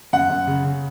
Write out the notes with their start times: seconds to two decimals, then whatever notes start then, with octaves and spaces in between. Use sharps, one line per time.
0.13 F#2 F#5
0.30 F#2
0.47 C#3
0.64 C#3